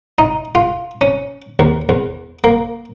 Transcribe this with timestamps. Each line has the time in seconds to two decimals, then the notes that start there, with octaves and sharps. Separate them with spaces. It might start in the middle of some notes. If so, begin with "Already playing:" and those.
0.18 D#4
0.55 F4
1.01 C#4
1.59 D#2
1.89 E2
2.44 A#3